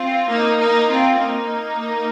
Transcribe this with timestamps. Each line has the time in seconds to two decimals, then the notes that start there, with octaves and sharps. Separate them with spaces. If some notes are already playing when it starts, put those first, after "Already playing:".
Already playing: C4 F4
0.28 A#3 D#4
0.59 A#3 D#4
0.89 C4 F4
1.19 A#3 D#4